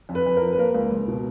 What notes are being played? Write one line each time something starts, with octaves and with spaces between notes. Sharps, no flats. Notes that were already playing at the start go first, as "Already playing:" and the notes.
F2
B4
F2
F3 A#4
B4
A#3 A#4
C#2
C#2
B2